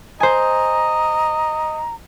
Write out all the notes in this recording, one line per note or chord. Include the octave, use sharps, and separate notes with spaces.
C5 D#5 G#5 A#5